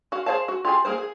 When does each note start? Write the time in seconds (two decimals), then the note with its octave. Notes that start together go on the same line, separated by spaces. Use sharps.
0.12 F#4 F5
0.26 G#4 C5 C#5 F5 A5
0.48 F#4
0.65 F4 G4 G#4 G#5
0.85 A#3 G#4 A#4 C5
0.98 G#4